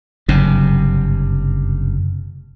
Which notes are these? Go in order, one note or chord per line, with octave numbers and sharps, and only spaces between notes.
F#1 G2 C3